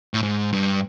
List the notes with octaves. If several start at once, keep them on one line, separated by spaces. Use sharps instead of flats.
A2
G#2
G2